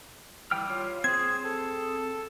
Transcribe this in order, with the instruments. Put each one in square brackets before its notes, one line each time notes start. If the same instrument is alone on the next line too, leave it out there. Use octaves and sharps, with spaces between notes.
[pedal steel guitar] E3 G5 F6 [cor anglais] G3
[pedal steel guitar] F4 C#5
[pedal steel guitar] C4 G#4 [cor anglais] C5 [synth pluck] G#6
[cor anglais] A4